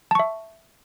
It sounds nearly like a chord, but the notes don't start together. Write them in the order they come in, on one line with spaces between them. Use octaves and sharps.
A5 C#6 E5